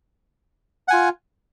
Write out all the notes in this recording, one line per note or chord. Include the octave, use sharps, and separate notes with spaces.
F4 F#5 G#5